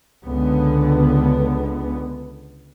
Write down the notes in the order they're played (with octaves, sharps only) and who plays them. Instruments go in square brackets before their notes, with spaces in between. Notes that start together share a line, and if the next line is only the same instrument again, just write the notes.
[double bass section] C#2 D3 B3